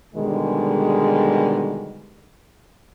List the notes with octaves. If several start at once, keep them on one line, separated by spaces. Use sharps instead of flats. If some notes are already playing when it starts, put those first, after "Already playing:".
B2 D3 D#3 G3 G#3